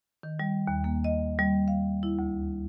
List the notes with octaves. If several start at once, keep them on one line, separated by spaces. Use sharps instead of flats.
D#3
G3
D#2
A#3
D#5
G3
F5
E4
D2